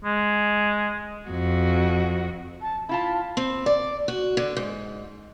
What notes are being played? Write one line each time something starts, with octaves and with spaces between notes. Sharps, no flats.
G#3
F2 F#4
A5
E4 F4 A5 B5
C4
D5
F#4
D3
G#2